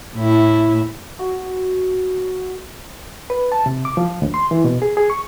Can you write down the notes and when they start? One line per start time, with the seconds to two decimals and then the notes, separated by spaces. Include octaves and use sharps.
0.16 A2 E4
1.19 F#4
3.30 B4
3.52 A5
3.66 C3
3.85 D6
3.97 F3
4.22 D2
4.34 C6
4.51 E3
4.64 B2
4.82 G#4
4.97 G#4
5.10 C#6